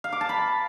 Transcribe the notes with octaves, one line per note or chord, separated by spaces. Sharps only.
F5
D6
A5
B5